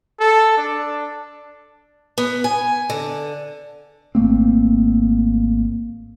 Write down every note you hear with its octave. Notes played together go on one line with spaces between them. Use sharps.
A4
D4
B3
G#5
D3
G#1 A3 A#3 C4